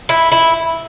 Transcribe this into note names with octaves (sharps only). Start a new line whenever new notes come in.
E4
E4